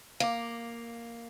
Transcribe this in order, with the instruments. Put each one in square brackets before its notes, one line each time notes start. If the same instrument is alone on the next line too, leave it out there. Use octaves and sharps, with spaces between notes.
[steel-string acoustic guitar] A#3 [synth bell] F5 D6